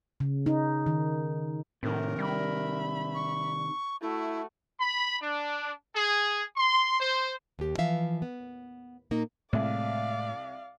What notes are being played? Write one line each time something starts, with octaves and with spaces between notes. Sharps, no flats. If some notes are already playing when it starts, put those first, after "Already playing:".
C#3
D#4
D#3
A2 C3 D#3 A#4
G3 E5 B5
C#6
A3 E4 F#4
B5
D4
G#4
C6
C5
D#2 G4
E3 F3 E5 F5
B3
A#2 A#3 D#4
C2 A2 G#3 D5 F5